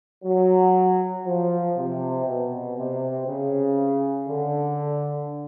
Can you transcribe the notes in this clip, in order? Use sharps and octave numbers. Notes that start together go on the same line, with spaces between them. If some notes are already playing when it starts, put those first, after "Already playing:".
F#3
F3
C3
B2
C3
C#3
D3